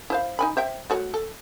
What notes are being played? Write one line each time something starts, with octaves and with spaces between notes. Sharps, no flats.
E4 C5 F5
D#4 G#5 B5
C5 E5 G5
A3 F#4 C#5
A4